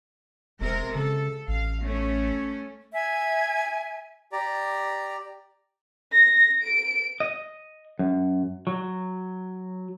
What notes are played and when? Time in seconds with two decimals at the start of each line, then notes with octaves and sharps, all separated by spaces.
0.60 E1 C3 G#3 A#4
0.95 C#3 A4
1.48 A1 F5
1.83 A3 C#4
2.93 E5 G#5
4.32 G4 D5 A#5
6.12 A#6
6.63 D7
7.20 D#5
7.99 F#2
8.67 F#3